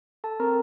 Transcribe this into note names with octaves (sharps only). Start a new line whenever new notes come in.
A4 A5
C4 A#4 A#5